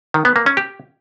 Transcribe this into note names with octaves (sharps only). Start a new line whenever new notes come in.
D#3
B3
A#3
C#4
G4